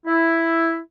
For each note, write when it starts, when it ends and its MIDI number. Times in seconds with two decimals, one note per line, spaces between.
0.07 0.79 64